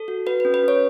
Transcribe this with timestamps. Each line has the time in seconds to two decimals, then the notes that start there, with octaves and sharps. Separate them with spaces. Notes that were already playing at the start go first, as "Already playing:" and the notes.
Already playing: A4
0.08 F#4
0.26 F#4 B4
0.40 C#4 B4
0.54 B4
0.63 C#4 C#5